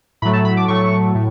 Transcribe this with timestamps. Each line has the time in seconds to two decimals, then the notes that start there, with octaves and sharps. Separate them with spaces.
0.22 A2 F#3 A3 B5
0.33 A5
0.45 B5
0.57 D6
0.68 A2 F#3 A3 C#6
1.15 A2